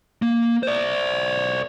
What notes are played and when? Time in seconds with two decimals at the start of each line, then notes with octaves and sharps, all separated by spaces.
0.22 A#3
0.63 C5 D5